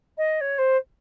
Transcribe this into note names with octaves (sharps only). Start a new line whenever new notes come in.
D#5
C#5
C5